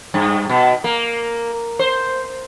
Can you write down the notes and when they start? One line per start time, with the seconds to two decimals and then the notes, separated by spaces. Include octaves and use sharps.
0.14 G2
0.49 B2
0.84 A#3
1.79 C5